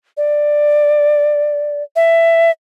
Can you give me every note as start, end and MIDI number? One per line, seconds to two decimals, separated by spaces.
0.17 1.83 74
1.96 2.51 76